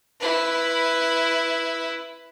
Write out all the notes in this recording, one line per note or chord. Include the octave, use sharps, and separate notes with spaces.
E4 B4